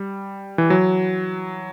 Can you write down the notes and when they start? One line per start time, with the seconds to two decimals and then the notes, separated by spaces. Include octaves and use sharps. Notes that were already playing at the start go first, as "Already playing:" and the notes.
Already playing: G3
0.58 E3
0.70 F#3